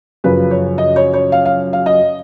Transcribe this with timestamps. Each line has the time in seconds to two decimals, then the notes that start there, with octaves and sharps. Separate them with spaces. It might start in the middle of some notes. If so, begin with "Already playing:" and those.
0.24 F#2 C#3 F3 B4
0.51 C#5
0.78 D#5
0.96 C#5
1.14 C#5
1.32 F5
1.45 F5
1.73 F5
1.86 D#5